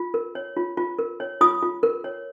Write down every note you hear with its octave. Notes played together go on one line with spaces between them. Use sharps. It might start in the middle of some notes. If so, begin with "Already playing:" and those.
Already playing: F4
A#4
C#5
F4
F4
A#4
C#5
F4 D#6
F4
A#4
C#5